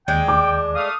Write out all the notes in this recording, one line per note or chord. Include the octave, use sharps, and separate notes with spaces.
D#2 G#3 D4 G5
D6
A3 F5 D#6